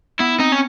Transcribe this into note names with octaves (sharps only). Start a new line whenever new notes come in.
B3 E4
C4 D#4
C#4